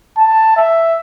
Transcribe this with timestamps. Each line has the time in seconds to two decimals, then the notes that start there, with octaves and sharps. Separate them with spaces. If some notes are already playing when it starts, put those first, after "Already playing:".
0.18 A5
0.57 E5